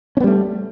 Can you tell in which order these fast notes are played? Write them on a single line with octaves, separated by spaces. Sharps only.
C#4 B3 G3 A3